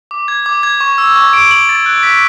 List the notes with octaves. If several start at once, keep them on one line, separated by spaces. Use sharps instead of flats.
D6
G#6
D6
G#6
C#6
E6
C#6
D7
F#7
A6
F#6
B6